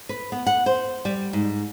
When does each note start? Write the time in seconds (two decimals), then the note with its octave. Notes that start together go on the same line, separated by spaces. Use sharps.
0.09 B4
0.32 B3
0.46 F#5
0.66 C5
1.05 G3
1.33 G#2